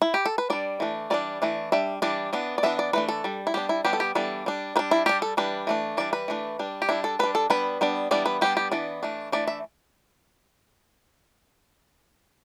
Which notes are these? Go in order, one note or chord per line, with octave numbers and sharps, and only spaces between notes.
E4
G4
A4
B4
G3 D4 D5
E3 A3 D4
E3 G3 D4 D5
E3 A3 D4
G3 D4 E5
E3 G3 D4 D5
E3 B3 D4
D5
E3 B3 D4 E5
D5
E3 A3 D4 B4
A4
G3 D4
E4
G3 B3 D4 G4
E4
G3 B3 D4 G4
A4
G4
E3 G3 B3 D4 A4
G3 D4
G3 D4 B4
E4
G3 D4 G4
A4
E3 G3 D4 B4
E3 A3 D4
E3 G3 D4 D5
B4
E3 A3 D4
G3 D4
G4
G3 D4 E4
A4
G3 D4 B4
A4
G3 B3 D4 B4
G3 B3 D4
E3 G3 B3 D4 D5
B4
G3 B3 D4 G4
G4
E3 B3 D4 D5
E3 A3 D4
E3 A3 D4 D5
E5